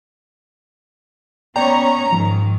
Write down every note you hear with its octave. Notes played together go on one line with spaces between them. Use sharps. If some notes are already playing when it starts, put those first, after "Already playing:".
B3 C#4 C#5 D5 G5 A#5
G#2 D#3 F3